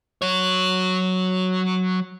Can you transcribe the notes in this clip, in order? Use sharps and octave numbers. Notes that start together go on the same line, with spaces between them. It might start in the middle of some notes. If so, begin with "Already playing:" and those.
F#3 C#5